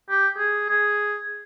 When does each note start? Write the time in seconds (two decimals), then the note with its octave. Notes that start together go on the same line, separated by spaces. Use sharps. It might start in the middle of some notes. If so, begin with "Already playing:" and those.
0.10 G4
0.38 G#4
0.70 G#4